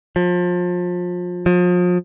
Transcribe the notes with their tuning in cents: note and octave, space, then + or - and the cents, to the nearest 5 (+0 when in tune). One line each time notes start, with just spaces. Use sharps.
F3 +30
F3 +35